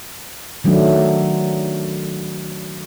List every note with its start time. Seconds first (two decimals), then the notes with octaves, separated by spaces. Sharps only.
0.64 D#3 F#3 A3 D4